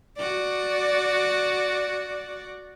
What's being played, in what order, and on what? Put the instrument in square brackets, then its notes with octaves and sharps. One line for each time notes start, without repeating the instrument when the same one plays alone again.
[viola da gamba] F#4 D5